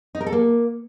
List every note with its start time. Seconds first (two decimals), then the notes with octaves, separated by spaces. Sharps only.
0.15 D#4
0.21 A#4
0.26 A4
0.32 A#3